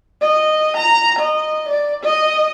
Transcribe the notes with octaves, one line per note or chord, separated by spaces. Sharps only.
D#5
A#5
D#5
D5
D#5